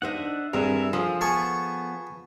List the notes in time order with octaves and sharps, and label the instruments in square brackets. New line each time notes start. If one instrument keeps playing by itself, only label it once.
[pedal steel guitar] D4 E5 F#5 [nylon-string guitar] D#4 C5 D#5
[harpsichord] G2 [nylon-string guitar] C4 D4 G#4 [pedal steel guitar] A#4 E5
[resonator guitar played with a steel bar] F3 [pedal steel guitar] G#4 [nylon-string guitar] A4
[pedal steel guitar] B3 [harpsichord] G#4 A5 C#6